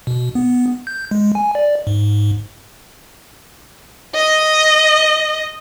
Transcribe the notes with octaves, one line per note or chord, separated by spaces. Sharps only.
B2
B3
G6
G#3
G#5
D5
G#2
D#5